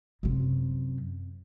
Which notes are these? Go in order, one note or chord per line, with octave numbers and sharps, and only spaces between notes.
F#2 C3